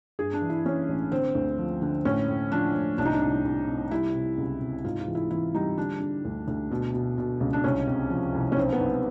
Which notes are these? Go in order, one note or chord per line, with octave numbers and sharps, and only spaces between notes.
G2 G#4
D4
E3
E4
E3 C#4
A1
D3 C4
D2
F3
D3
A2 C#4
A2
F3 D4
A2
C2 D4
D#4
D4
C2
C2
C3
G3 E4
C3
C#2
C3
G#2 F4
F4
E3
E4
E3 E4
G3 D#4
D3 D4
D3
D2
D2
B2
B2
B2
C#2
D4
C2 C#4
C3
F3
C2
C#4
B1 C4
B3
B1